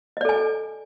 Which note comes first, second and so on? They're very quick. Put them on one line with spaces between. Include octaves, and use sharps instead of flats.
D#5 D5 A4 G#5